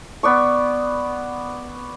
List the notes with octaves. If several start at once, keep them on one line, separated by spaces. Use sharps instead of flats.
B3 D5 C#6